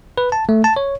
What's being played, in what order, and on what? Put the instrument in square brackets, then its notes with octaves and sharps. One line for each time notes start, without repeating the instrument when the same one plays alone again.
[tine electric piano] B4
A5
A3
A5
C#5